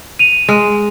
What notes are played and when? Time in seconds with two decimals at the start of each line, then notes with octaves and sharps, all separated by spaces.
0.19 D#7 F7
0.49 G#3